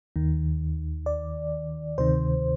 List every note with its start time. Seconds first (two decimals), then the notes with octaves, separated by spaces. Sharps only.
0.16 D#2 D#3
1.06 D5
1.98 D2 C3 D#3 C5